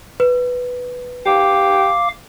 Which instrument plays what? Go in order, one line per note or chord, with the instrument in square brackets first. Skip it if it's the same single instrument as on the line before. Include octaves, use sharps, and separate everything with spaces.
[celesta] B4
[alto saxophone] G4 [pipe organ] F5 D6